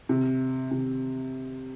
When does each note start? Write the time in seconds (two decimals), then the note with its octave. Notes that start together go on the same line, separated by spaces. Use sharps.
0.09 C3
0.71 C3